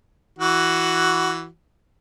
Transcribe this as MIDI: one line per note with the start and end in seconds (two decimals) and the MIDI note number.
0.39 1.46 52
0.39 1.46 66